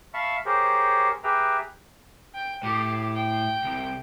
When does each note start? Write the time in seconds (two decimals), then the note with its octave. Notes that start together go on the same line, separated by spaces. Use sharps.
0.14 E5 F5 A5 B5 C#6 E6
0.46 G4 G#4 A#4 C5 C#5
1.24 G4 G#4 B4 E5 G5 A#5
2.35 G5
2.63 A2 G4
3.16 G5
3.64 C2